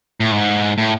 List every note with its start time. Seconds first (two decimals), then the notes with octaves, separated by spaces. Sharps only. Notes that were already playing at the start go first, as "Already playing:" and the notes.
0.20 A2
0.32 G#2
0.78 A2